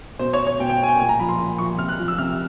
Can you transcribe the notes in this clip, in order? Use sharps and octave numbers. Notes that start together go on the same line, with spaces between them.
B2 C5
C#5
C#5
B2 G5
G5
G#5
G5
A#2 G#5
A#5
F3 B5
C6
A#2
F3 C#6
C3 F6
F#6
F3
E6
C3 F6